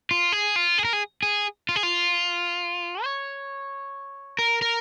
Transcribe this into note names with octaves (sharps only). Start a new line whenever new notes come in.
F4
G#4
F4
G#4
A#4
G#4
G#4
F4
G#4
F4
C#5
A#4
A#4